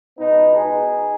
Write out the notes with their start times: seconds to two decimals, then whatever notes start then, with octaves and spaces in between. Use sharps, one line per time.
0.18 C#2 B2 B3 D#4
0.56 D#4 G#4